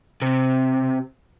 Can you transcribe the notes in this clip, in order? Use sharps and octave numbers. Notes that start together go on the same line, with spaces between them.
C3